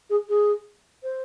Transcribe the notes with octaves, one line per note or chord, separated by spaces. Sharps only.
G#4
G#4
C5